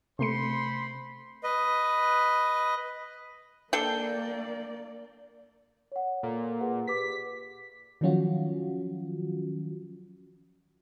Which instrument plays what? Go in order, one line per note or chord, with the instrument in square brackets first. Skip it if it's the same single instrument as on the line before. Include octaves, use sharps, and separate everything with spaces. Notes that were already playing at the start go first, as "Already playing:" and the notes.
[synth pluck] C3 A3 C#7 [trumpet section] C5 B5 C6
[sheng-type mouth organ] B4 D#5
[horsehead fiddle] A#3 D5 [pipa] D4 A4 G5
[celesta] C#5 F#5
[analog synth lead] A#2 [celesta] A4
[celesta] G#4 B4 F#5
[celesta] G4 B4 D6 [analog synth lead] B6
[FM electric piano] D#3 F3 F#3 C#4 F4 F#4